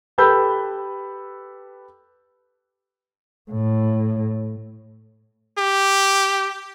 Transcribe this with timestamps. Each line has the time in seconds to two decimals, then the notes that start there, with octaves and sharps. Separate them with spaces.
0.18 G4 A4 B4 B5 E6 G6
3.51 A2
5.58 G4